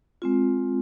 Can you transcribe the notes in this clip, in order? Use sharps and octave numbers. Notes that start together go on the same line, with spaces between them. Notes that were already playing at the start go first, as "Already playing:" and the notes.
G#3 C4 F4